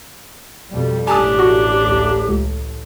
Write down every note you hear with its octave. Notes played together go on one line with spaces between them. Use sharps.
F2 B2 G3
A1 A3 D4 G4 G#5 A5 D#6
F#4
D2
C#2